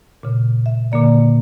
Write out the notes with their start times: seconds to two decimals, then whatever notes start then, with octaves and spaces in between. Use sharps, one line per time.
0.23 A#2 C#3
0.66 E5
0.92 A#2 D3 A#3 D5